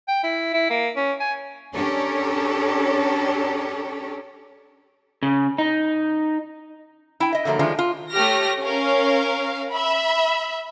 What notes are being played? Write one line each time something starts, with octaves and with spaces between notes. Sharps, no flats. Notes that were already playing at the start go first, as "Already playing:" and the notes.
G5
E4
E4
A#3
C#4
G#5
C#4 D4 G4 A4 A#4 C#5
C#3
D#4
E4 G5
D#5 E5
D3 F3 F#3 A3 A#3
D#3 F3 G#3 A3 D4 F4
F4
A3 G4 C#5 F6 A#6
C#4 A#4 F5
E5 B5